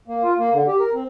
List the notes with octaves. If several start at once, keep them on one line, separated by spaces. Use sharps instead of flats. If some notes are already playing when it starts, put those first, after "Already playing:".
A#3
F4
A#3
D3
G4
A#4
C4